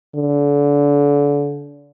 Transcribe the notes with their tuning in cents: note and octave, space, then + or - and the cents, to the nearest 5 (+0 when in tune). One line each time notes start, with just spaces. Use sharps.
D3 -30